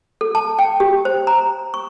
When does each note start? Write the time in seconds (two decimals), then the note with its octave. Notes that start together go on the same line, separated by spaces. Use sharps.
0.21 A4
0.35 A5
0.59 G5
0.80 G4
1.05 C5
1.27 A#5
1.74 C#6